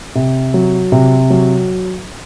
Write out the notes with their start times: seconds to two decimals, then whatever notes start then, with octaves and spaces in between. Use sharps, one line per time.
0.15 C3
0.54 F#3
0.92 C3
1.30 F#3